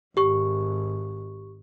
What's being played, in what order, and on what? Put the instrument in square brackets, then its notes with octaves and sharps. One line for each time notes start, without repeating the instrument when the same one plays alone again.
[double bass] G#1 [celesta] G4 C#6